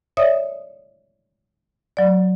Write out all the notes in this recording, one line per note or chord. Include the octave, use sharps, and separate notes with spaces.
C#5 D5 E5 D#6
F#3 D5